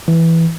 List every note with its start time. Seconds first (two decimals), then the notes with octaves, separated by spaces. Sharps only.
0.08 E3